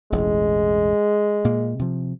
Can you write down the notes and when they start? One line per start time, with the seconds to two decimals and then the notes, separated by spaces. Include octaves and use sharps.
0.12 E1 A1 A2 G#3
1.45 A#2 A#3
1.79 C3 F3